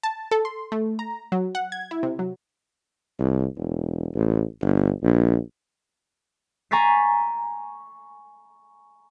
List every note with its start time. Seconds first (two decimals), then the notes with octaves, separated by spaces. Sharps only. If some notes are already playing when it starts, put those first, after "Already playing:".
0.03 A5
0.31 A4
0.45 C6
0.72 A3
0.99 A#5
1.32 F#3
1.55 F#5
1.72 G#6
1.91 E4
2.03 C3
2.19 F#3
3.19 C2
3.57 E1
4.14 A1
4.62 G1
5.03 A#1
6.71 G#5 A#5 C#6 A6 B6 C7